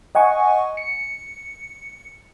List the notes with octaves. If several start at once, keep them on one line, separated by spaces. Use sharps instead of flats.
D#5 F#5 G#5 C#6
C#7